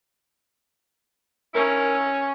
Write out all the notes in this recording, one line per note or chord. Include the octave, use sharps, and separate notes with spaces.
C#4 D#4 E4 A#4